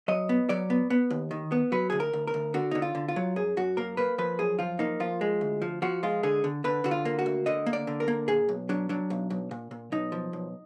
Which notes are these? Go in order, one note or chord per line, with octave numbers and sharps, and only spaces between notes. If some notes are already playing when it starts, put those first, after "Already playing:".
F#3 D#5
B3
F#3 D5
B3
B3
D#2
D#3
B3
F#3 B4
D2 G#4
A#4
D2
A#4
D2
D3 F#4
D3 D#4
F4
D3
F4
F#3
F#2 G#4
F#2 F#4
A#3 A#4
A#3 B4
F3 B4
F#2 G#4
F3 F4
A#3 D#4
F3 F4
G#3
D2
F3
F3 F#4
G#3 F4
D3 G#4
D3
D3 B4
D3 F#4
F4
A#3
F#4
D2
D3 D#5
A#3
D5
D3
A#4
A#3
A#2 G#4
B1
F#3 D4
F#3 D4
B1
B1
A#2
A#2
B1 D#4
F3
B1